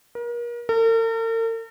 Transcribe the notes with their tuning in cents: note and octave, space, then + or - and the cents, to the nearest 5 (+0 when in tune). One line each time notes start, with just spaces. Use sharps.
A#4 +35
A#4 -45